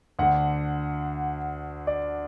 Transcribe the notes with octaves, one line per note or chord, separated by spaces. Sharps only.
D2 D3 F#5
D5